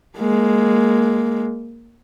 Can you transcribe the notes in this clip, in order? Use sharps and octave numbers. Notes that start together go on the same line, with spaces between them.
G#3 A#3